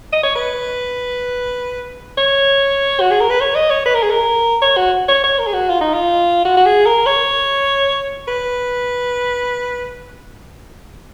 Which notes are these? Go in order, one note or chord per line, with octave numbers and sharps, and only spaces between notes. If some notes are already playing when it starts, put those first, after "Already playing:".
D#5
C#5
B4
C#5
F#4
G#4
A#4
B4
C#5
D#5
C#5
B4
A#4
G#4
A#4
C#5
F#4
C#5
C#5
A#4
G#4
F#4
F4
D#4
F4
F#4
F#4
G#4
A#4
C#5
B4